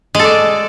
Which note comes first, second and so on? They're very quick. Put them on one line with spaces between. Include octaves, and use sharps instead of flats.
G#3 A4 D5